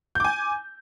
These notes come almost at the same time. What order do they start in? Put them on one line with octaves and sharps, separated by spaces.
G6 D6 G#5